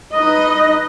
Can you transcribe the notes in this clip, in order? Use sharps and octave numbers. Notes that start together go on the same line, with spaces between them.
D#4 B4 D#5